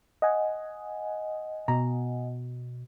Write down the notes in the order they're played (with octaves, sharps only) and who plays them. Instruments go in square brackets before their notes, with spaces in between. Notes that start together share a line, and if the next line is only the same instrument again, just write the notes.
[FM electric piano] D#5 F#5 G#5
[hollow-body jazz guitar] B2 A#5